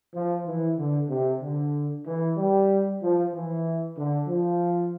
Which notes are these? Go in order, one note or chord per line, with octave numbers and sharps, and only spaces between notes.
F3
E3
D3
C3
D3
E3
G3
F3
E3
D3
F3